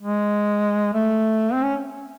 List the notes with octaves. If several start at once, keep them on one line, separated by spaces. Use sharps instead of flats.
G#3
A3
C4
C#4